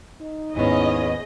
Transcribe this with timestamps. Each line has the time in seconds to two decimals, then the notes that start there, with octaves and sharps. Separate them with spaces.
0.21 D#4
0.55 D#2 G#2 B3 C#4 E4 G#4 D#5